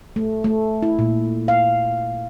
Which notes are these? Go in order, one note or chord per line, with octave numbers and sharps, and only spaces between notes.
A3
A3
E4
A#2
F5